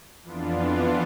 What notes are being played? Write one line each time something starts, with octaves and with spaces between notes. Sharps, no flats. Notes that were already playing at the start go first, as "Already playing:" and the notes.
F2 E3 B3 D4 F4